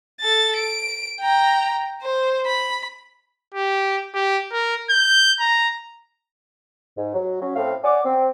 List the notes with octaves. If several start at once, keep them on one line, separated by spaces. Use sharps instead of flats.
A4 A6
D7
G5 A#5
C5
B5
G4
G4
A#4
G6
A#5
G#2
F#3
F#3 C#4
A2 C4 A4 F5
C#5 D5 F#5 G#5 D6
C4